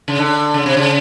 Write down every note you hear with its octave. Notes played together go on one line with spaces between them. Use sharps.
C#3
D3
C#3
C3
C#3